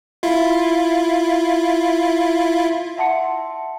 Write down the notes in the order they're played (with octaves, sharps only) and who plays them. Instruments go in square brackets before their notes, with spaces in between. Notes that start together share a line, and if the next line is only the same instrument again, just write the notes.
[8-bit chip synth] E4 F4
[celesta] E5 F#5 A5 C6 C#7